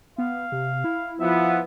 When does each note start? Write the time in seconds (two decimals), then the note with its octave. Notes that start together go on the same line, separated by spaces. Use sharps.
0.18 B3 F5
0.52 C3
0.84 E4
1.20 F3 B3 E5